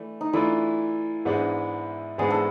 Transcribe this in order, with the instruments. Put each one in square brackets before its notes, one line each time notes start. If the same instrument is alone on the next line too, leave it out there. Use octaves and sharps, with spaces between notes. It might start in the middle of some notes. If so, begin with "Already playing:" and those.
Already playing: [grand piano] E3 A3 D4
[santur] D#4
[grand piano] E3 A3 D4 F4 [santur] E4
[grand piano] G#2 E3 G#3 B3 D4
[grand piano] G#2 E3 G#3 B3 D4 [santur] G#4
[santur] A4